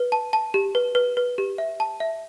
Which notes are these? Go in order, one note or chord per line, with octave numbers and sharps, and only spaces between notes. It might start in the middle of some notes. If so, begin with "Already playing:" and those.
Already playing: B4
A5
A5
G4
B4
B4
B4
G4
E5
A5
E5